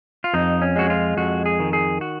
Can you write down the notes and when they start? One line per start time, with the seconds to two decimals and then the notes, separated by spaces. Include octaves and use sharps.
0.24 F4
0.34 F2 D#4
0.62 C#4
0.76 G#3 F#4
0.90 F4
1.17 F2 F#4
1.46 G#4
1.60 D#3
1.73 G#4
2.01 F#4